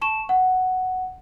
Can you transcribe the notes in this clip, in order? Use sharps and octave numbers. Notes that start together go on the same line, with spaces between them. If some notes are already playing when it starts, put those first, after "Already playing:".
A5 C#6 E7
F#5